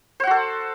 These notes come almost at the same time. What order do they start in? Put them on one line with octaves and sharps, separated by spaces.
C5 F#5 F#4 A4